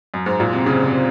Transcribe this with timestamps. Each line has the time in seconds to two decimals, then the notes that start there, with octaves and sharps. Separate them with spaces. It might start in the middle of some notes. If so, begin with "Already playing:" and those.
0.14 F#2
0.26 G#2
0.40 A#2
0.53 C3
0.66 C#3
0.84 C3